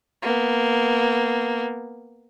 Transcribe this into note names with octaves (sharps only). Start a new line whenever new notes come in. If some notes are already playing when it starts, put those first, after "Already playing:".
A#3 B3